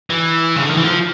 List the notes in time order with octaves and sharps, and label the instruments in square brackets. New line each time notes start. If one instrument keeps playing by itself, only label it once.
[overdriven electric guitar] E3
C#3
D3
D#3
E3
F3